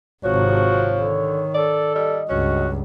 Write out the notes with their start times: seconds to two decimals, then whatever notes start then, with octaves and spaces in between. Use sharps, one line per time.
0.24 G#1 C3 F3 F#4 C#5
0.98 D3 D#3
1.54 A4 D5
1.95 G3 D#5
2.29 C#2 G2 C#4 F#4